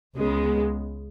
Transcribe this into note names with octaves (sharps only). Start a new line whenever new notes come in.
C#2 C#3 G#3 B3